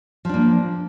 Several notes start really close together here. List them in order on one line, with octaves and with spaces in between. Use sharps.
F3 D4 A#3